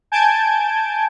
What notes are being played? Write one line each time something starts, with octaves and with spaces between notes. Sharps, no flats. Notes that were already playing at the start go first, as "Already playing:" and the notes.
G#5 A5 G6 G#6 D7